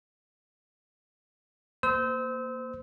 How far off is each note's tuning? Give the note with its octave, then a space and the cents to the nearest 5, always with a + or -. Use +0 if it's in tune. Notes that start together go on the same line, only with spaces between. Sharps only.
A#3 +0 C5 -25 E6 -35